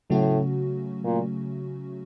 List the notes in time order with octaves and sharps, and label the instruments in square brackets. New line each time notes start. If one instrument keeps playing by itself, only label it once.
[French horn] A2 [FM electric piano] C#3 F#3 A3 C#4 F#4
[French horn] A#2